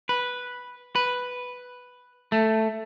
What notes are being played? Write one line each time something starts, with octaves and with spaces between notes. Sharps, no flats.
B4
B4
A3